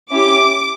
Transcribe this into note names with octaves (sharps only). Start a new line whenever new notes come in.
C#4 E4 G4 D6